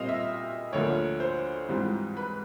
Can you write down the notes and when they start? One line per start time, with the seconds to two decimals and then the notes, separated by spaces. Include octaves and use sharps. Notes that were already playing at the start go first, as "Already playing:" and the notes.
Already playing: A#2 G3 C4 D#5 F5
0.09 E5
0.73 D2 D3 F3 A#3 C#5
1.20 C5
1.68 G#2 E3 G3 C4 F4
2.17 B4